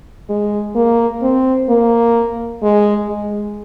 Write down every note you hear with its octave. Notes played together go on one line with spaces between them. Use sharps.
G#3
A#3
C4
A#3
G#3
G#3